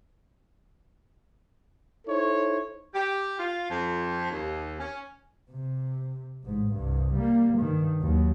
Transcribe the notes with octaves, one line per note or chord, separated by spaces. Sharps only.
D#4 E4 A4 C5 C#5
G4
F4
F2
D#2
C#4
C3
A1 G#2
C2 G2
G3 A#3
G2 D#3
D#2 F#3